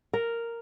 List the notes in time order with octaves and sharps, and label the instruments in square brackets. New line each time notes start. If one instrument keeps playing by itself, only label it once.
[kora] A#4